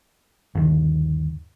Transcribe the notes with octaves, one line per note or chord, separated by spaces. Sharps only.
G1 D#2 D#3